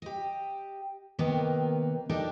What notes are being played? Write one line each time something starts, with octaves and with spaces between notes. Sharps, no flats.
G4 D#5
D#2 C3 D#3 A#3 B3 D#4
D4 D#4 G4 A4 A#4